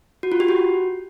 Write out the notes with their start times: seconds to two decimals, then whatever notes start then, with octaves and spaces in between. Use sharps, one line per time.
0.23 F#4
0.32 F4
0.40 G4
0.48 F#4